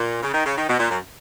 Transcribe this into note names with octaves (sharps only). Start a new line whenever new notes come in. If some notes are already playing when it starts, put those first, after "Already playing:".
Already playing: A#2
C#3
D#3
C#3
D#3
B2
A#2
F#2